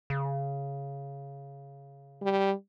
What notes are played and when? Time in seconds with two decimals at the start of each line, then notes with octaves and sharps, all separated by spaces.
0.10 C#3
2.22 G3